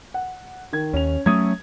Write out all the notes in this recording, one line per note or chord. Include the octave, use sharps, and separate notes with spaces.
F#5
D#3 G#6
D#2 C#4 F7
F#3 A3 C#4 D#6 G#6